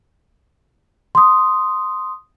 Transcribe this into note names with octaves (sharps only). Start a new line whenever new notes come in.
C6 D#6